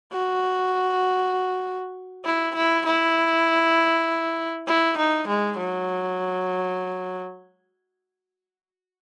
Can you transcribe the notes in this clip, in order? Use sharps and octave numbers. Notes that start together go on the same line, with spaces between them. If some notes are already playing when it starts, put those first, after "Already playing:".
F#4
E4
E4
E4
E4
D#4
G#3
F#3